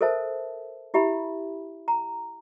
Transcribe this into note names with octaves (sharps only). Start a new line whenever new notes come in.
A4 A#4 C5 E5 A5
E4 G4 E5 G#5 B5
A#5